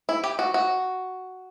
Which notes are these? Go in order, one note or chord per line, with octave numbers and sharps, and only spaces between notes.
E4
G4
F#4
F#4